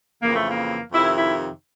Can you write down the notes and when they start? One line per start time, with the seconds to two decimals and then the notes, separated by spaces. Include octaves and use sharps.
0.22 F2 C#3 E3 A#3
0.35 A3
0.48 A#3
0.92 F2 C3 D#3 E4
1.16 E4